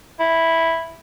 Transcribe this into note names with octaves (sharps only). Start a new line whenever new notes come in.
E4